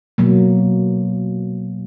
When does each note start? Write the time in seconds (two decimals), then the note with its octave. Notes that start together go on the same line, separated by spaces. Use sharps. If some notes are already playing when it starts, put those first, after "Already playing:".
0.18 B2 F#3 A#3